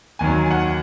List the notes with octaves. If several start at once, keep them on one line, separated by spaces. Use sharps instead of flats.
D#2 D#3 F#3 G#5
G#5
F#5